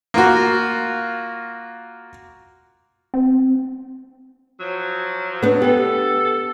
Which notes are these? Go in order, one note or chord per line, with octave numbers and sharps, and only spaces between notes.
A#3 F4 F#4
C4
F3 F#3
B3 D4
B3 G4 A4